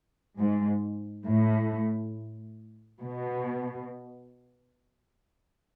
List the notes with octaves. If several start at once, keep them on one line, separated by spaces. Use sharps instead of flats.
G#2
A2
B2